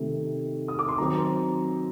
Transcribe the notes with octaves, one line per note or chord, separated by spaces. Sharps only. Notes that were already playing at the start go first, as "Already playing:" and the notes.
Already playing: C3 D#3 A3 D#4
D#6
D6
C6
D#3 F#3 C4 A#5